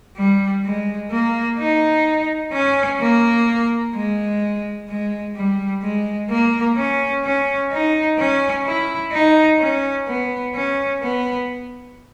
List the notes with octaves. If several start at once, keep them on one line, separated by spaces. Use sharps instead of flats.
G3
G#3
A#3
D#4
C#4
A#3
G#3
G#3
G3
G#3
A#3
C#4
C#4
D#4
C#4
E4
D#4
C#4
B3
C#4
B3